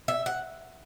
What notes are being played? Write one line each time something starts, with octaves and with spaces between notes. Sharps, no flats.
E5
F#5